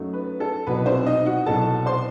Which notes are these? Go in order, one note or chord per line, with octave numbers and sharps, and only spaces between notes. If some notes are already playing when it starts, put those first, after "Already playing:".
Already playing: F#2 F#3 A3 D#4
B4
A4
C2 B2 F#3 B4
C4 C5
D#4 D#5
F#4 F#5
C2 B2 F#3 A4 A5
C5 C6